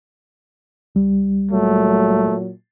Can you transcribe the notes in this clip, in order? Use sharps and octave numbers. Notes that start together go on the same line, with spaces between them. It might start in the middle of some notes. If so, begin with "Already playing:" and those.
C#2 G3
A#2 F#3 A3